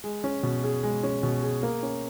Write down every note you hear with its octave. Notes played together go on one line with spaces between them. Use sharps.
G#3
C#4
B2
G#4
G#3
C#4
B2
G#4
A#3
C#4